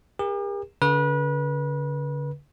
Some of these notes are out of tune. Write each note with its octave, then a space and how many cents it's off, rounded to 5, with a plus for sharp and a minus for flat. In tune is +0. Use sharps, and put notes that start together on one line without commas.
G4 +45 A#4 +25
D3 -45 B4 -30